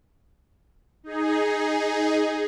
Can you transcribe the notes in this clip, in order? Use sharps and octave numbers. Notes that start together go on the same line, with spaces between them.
D#4 G#4